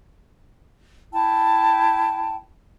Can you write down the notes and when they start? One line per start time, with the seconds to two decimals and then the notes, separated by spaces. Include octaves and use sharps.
1.13 E4 G5 A5